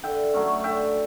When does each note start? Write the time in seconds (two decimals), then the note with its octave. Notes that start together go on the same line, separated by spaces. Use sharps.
0.03 D3 E5 G5
0.34 F#3 A3 C#4
0.64 D3 E5 G5